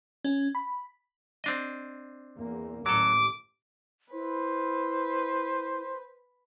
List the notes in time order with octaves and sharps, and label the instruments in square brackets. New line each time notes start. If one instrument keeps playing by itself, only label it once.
[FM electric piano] C#4
B5
[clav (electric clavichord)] C4 D4 D#5
[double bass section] E2 A#3
[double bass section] A1 D#2 [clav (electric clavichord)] F#3 A4 [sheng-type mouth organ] D6
[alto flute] E4 [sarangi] B4 [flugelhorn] C5